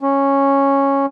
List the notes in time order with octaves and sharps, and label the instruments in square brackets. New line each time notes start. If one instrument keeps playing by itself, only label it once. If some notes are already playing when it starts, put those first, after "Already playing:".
[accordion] C#4